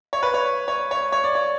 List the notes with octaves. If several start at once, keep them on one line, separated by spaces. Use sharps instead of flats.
C#5
B4
C#5
C#5
C#5
C#5
D5
C#5